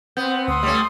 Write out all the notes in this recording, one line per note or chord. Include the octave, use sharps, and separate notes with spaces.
B3 C4 G6
D2 C6 D#6 E6
G3 A3 C#4